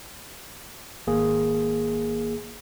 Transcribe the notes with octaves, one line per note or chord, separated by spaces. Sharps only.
G#1 A#3 G#4